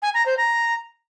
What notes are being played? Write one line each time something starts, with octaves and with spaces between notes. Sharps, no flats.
G#5
A#5
C5
A#5